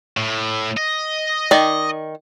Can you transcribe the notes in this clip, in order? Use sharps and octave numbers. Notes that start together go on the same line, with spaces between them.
A2
D#5
D#3 D5